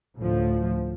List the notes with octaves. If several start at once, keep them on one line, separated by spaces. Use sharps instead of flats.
D2 A2 F3